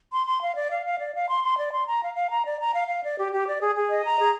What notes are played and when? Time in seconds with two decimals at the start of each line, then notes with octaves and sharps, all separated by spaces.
0.12 C6
0.27 C6
0.41 F5
0.55 D5
0.70 F5
0.85 F5
0.99 D5
1.14 F5
1.28 C6
1.42 C6
1.57 D5
1.71 C6
1.86 A#5
2.01 F5
2.15 F5
2.30 A#5
2.44 D5
2.59 A#5
2.73 F5
2.87 F5
3.03 D5
3.17 G4
3.32 G4
3.46 D5
3.60 G#4
3.75 G#4
3.90 D#5
4.04 A#5
4.19 G#4